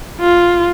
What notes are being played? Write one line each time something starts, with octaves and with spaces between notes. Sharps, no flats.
F4